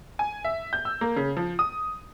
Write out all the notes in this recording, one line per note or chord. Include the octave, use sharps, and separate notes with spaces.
G#5
E5
G6
E6
A#3
C#3
F3
D#6